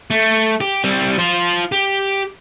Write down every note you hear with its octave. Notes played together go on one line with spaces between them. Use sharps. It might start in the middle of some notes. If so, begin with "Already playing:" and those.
A3
G4
G3 C4
F4 C5
G4